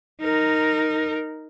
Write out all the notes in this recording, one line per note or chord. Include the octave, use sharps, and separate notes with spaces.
D#4 A#4